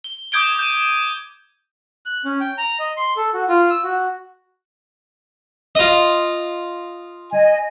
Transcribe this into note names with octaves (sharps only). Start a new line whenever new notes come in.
G7
D6 D#6 G6 G#6 D7 G7
G6 D#7
F#6
C#4
G5
A#5
D#5
C6
A4
F#4
F4
E6
F#4
F4 D#5
D#5 G#5